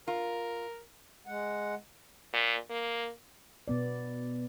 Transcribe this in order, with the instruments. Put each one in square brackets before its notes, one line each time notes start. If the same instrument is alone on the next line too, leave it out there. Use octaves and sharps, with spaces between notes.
[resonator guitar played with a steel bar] F4 [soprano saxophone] A#4
[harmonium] G#3 F#5
[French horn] A#2
A#3
[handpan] B2 B3 D5